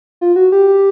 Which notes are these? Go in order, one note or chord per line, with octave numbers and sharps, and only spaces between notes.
F4
F#4
G4